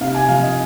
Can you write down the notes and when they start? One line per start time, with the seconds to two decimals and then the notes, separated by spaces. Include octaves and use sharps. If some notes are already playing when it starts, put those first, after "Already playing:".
0.01 C3 F5
0.14 G#5
0.28 F3 F5
0.43 D#5